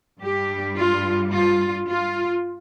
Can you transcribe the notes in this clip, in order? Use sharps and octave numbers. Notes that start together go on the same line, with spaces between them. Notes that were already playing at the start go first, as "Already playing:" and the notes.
G2 G3 G4
F4
F4
F4